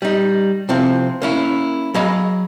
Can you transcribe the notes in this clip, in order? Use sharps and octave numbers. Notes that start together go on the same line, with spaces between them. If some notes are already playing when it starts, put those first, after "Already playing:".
G3 D#4
C3 F3 C4 E4
A#3 C#4 E4
F#3 G#4 D#5 F5 B5